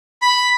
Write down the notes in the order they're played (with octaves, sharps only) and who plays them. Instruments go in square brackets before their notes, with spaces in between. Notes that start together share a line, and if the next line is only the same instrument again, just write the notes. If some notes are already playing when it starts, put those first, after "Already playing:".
[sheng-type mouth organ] B5